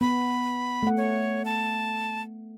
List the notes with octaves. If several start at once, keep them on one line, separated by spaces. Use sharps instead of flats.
B3 B5
A3 F#5
C#5
A5